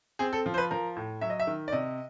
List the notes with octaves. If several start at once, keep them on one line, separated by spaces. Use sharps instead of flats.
C4 G#4
A4
F3
C5
B4
F3 A#4
A2
F#3 E5
D#5
E5
D#3
D5
C3 D#5